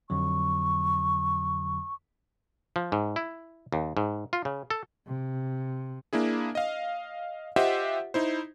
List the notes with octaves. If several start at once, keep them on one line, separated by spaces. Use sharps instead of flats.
F2 D3 F#3 C#6
F3
G#2
E4
D#2
G#2
F4
C#3
A4
C3
A#3 D4 E4 G#4
D#5 F5
F4 G4 C5 D#5 E5 F#5
D#4 E4 C5